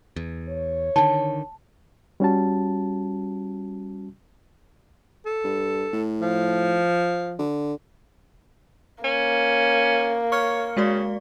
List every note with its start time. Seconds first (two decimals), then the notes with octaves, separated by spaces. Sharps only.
0.16 E2
0.49 C#5
0.96 D3 D#3 A5
2.20 G3 C#4 F#4 A5
5.26 A4
5.44 G2
5.93 A2
6.21 F3
7.39 D3
9.04 A#3 C#4
10.32 C#5 C#6 F6 C#7
10.77 C#3 G#3 F#4 D5